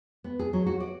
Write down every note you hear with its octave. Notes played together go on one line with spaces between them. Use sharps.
B3
G#4
F#3
F#4
D5